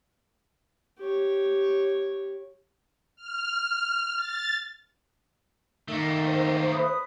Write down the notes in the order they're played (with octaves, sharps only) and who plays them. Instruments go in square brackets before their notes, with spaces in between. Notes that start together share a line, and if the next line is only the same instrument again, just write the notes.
[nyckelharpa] G4 C#5
[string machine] F6
A6
[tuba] D#3 [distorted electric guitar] A3 A#3
[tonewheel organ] C5
[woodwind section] B4 B5 D#6